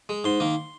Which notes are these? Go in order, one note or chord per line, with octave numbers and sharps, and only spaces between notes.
G#3
G#2 C6
D#3 A#3